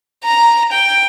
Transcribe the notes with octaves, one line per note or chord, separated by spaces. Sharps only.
A#5
G5